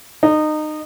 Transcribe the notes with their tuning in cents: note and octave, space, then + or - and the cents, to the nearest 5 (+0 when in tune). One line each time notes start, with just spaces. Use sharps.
D#4 -25